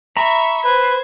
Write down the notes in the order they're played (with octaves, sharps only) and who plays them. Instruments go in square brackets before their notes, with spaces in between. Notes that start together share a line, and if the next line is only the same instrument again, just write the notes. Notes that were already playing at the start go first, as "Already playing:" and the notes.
[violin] E5 C#6 [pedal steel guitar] A#5 B5
[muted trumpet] B4 [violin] C5 G#6